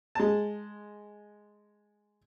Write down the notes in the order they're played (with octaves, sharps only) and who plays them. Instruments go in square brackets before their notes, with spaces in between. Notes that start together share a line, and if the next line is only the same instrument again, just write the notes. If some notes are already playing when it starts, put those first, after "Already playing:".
[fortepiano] G#3 A5